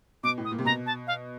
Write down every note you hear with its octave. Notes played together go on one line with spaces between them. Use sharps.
B2 D6
A2
D#6
A#2
C3
B2 A#5
A5
F5